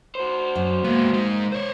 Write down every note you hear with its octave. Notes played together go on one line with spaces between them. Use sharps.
F#4 C5
F#2
G#3 A#3 B3
G#3 D#4
C5 C#5